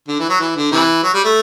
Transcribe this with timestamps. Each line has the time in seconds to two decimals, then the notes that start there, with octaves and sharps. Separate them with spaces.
0.08 D3
0.19 E3
0.29 F#3
0.40 E3
0.56 D3
0.72 C3 E3
1.03 F#3
1.13 G3
1.24 A3